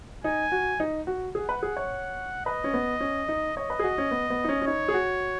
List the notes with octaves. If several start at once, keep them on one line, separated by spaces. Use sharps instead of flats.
D#4 G#5
F#4
D#4
F#4
G#4 F#5
B4
G#4
C#5
B4 D#5
C#4
B3
C#4
D#4
C#5 D#5
B4
G#4
F#4
C#4
B3
B3
D#4
C#4
C#4
D#4 C#5
G#4
F#4